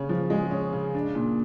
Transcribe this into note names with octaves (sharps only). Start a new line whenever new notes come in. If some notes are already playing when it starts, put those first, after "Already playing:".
Already playing: C#3 C#4
F3
G#3
C#4
C#3
D4
A#2